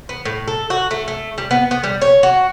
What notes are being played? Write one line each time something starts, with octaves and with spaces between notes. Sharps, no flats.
B3
A2
A4
F#4
A3
A3
G3
B3
B3
G3
C#5
F#4